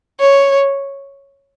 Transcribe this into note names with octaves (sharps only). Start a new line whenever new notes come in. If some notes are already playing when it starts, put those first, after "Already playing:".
C#5